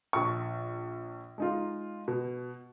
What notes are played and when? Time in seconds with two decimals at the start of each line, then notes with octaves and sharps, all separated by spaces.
0.13 A#1 C#6
1.38 G#3 D#4 F4
2.08 B2